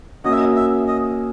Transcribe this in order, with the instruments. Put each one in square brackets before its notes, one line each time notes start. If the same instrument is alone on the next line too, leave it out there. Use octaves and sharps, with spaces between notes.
[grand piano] A#3 C#4 F#4 [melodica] D#5
[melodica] E5
D#5
E5
D#5